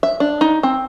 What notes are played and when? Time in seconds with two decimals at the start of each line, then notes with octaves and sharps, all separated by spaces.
0.03 E5
0.20 D4
0.41 D#4
0.63 C4